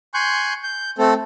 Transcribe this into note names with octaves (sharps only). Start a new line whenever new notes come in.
G#5 C6 C#6 F#6 G6
G6
A3 C4 A4